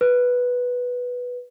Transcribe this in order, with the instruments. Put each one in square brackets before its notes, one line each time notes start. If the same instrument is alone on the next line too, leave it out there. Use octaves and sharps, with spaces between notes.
[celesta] B4